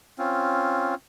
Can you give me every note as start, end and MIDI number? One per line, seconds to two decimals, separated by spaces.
0.19 0.95 60
0.19 0.95 61
0.19 0.95 65